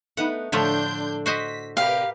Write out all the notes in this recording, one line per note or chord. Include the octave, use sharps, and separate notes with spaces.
A3 B3 D#4 F#5
A2 D3 F3 A3 D4 C6 G6
F#4 C5 D#5 B6
C3 G4 A#4 B4 D5 F5 G5